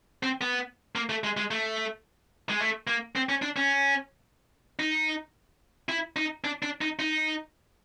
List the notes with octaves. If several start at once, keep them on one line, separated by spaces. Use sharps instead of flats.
C4
B3
A#3
A3
G#3
G#3
A3
G#3
A3
A#3
C4
C#4
D4
C#4
D#4
E4
D#4
D4
D4
D#4
D#4